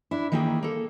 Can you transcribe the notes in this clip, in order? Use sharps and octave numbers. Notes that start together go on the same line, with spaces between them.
D4 E4
D#3 E3 A#3 E4 G#4 G5
A#3 A4